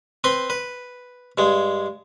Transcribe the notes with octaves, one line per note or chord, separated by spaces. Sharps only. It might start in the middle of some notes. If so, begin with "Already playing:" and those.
C4 B4 C6
B4
G2 G#3